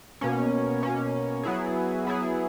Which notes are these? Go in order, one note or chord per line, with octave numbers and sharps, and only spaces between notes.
B2 A#3 C#4
B2 A#3 C#4
F#3 B3 E4 G#4
F#3 B3 E4 G#4